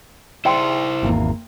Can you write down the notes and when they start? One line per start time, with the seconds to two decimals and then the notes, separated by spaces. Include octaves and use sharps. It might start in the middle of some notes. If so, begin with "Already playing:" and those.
0.45 D#4 E4 G#4 C5 D5 E5 G5 C6
1.03 G#1 E2 A#3 F4